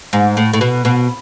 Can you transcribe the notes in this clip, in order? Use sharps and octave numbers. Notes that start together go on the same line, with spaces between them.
G#2
A2
A2
B2
B2